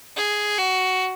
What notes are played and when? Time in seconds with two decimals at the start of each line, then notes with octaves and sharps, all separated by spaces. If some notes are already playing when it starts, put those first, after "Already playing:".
0.16 G#4
0.58 F#4